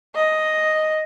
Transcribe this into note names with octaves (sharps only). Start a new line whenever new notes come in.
D#5